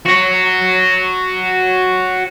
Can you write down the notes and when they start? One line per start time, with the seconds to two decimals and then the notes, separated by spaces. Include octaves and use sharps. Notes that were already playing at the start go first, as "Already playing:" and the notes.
0.06 F#4 C#5